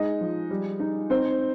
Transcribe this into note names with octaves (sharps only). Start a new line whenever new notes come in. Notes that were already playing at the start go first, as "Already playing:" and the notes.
Already playing: G#3 D#4 D#5
F3
G3
D#4
C4 D#4 C5